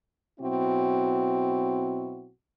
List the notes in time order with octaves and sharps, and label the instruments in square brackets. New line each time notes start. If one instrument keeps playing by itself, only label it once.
[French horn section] B2 F#3 C4 E4 F#4